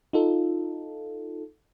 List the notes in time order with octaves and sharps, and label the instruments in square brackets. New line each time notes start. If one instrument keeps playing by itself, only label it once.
[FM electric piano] D#4 F4 A4